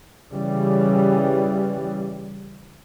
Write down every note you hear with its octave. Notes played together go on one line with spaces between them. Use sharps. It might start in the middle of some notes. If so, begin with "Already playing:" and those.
C#3 E3 G3